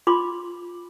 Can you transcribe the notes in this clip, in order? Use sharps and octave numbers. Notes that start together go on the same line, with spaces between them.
F4 B5 C6 D6